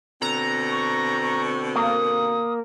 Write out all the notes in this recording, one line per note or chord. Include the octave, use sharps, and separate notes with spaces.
B2 D3 C4 A#5
C#6
C#6
A#3 D#6